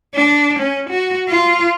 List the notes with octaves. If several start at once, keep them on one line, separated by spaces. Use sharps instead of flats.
D4
C#4
F#4
F4